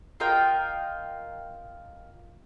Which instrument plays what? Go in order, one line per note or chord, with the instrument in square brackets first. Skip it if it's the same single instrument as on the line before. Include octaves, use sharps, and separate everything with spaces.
[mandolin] F4 A#4 D#5 G5